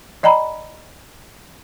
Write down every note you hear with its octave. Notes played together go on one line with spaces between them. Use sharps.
D5 D#5 G5 A#5 B5